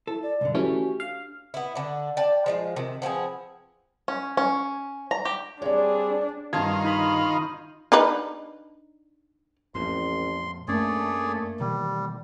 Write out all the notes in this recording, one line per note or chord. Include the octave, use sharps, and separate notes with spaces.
E4 A4
D5
B1 F#2 D3
E3 A3 C#4 F#4 G4 C#5
D4 F5
B3 E4
D3 D4
D5 G5 A5
F3 G#3 F4
C3 D#3
F3 B3 C4 G#4
C#4
C#4
A#5
G4
G3 C4 D4 G#4 C#5 D5
G2 D#3 F4 A5 G#6
D#4 B5
D4 D#4 B4
A1 F2 A#2 C6
F#2 A3 A#3 C#4 D4 G#4 C#5 D5
B2 D#3 E3 G3